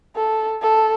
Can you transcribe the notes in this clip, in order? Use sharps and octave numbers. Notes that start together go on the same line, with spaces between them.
A4
A4